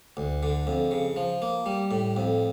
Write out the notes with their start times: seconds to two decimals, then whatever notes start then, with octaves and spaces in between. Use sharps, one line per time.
0.17 D2
0.43 D3
0.67 F2
0.91 C#3
1.16 F3
1.42 A#3
1.66 G3
1.91 A2
2.17 F2